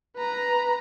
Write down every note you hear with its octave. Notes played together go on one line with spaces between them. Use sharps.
B4 A#5